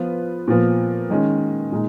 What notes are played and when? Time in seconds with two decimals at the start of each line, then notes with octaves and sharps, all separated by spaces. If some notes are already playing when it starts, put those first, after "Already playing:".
Already playing: F3 B3 F4 B4
0.47 A#2 F3 B3
1.10 D#3 G#3 C#4
1.72 A#2 G#3 D#4